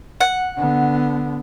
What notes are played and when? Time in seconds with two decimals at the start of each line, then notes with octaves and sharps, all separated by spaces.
0.21 F#5
0.58 D3 B3